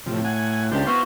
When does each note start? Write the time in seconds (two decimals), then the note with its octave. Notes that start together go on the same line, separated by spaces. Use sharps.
0.06 A2 C3 F3
0.25 F#5 G#5
0.71 C#2 D4 G4 C5
0.87 B3 E4 F#4 C5 F5